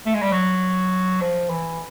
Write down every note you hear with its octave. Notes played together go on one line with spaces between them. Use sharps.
A3
G#3
G3
F#3
F3
E3